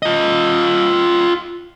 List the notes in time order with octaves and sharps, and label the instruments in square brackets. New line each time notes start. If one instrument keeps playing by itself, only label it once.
[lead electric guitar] F4 D#5